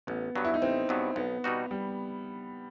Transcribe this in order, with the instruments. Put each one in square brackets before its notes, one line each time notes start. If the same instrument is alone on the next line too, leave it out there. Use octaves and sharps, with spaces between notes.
[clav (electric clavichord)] A1 [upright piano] B3
[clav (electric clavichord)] G2 F#3 B3
[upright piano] E4
D#4
[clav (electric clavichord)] A1 [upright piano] C4
[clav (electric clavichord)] G2 F#3 B3
[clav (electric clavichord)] B1 [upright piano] B3
[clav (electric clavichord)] B2 G3 D#4 F#4
[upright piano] G3